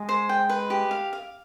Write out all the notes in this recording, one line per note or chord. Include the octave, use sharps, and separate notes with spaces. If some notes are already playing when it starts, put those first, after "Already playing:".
Already playing: G#3
C5
G5
B4
G4
F5
F5